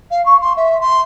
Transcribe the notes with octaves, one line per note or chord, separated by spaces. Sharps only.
F5
C#6
C6
E5
C6